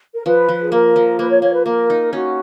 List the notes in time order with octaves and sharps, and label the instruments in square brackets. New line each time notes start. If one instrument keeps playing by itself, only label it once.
[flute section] A#4
[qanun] F3 [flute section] B4
[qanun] F3
[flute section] G#4
[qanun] A#3 [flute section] A#4
[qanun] F3
[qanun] A#3 [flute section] B4
[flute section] C#5
[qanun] A#3 [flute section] C#5
[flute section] B4
[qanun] A#3 [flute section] A#4
[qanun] D#4
[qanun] C#4 [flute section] F#4